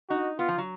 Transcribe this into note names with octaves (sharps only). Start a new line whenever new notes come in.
D#4 F#4
B3 F4
F3
F#3